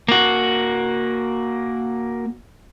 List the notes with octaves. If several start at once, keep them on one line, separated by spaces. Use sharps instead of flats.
A#3 F#4